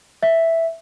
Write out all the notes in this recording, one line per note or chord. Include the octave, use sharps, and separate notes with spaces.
E5